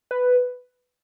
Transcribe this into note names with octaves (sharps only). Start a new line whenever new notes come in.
B4